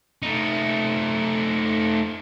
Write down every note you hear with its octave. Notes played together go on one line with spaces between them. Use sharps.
A3 D#4